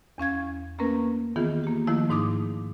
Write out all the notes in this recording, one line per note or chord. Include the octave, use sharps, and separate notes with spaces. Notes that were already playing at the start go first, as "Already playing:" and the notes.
E2 C#4 F5 G#6
A3 A#3 C4 C#4 A#4 B4
D#3 E3 B3 F4 G#4
A#3 G4
D#3 F3 A3 E4
G#2 D#4 D6 D#6